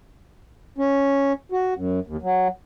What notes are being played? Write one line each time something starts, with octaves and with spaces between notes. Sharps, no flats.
C#4
F#4
F#2
D#2
F#3